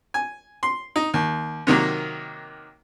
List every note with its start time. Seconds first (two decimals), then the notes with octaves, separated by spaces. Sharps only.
0.14 G#5
0.63 C6
0.96 D#4
1.14 D#2
1.67 C3 D#3 F#3 A#3